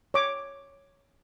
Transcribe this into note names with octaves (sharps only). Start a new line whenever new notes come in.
C#5 D6